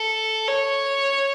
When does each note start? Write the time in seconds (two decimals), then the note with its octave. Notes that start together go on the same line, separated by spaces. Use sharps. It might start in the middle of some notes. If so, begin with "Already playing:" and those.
Already playing: A4
0.48 C#5